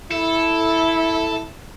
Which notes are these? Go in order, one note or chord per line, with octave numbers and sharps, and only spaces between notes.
E4 A4